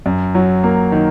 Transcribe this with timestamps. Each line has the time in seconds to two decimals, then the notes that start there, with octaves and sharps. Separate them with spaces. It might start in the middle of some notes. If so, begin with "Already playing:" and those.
0.06 F#2
0.35 F#3
0.64 A#3
0.92 D#3